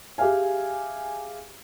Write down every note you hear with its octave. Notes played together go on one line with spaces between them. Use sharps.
G4 G#4 E5 F5 G#5